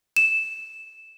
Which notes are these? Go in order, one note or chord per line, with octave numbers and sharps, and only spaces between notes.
E7